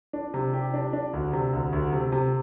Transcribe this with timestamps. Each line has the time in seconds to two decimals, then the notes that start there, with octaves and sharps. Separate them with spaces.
0.13 D4
0.34 C3
0.53 G4
0.74 D4
0.93 D4
1.13 D2
1.33 C3
1.53 D2
1.73 D2
1.92 C3
2.12 C3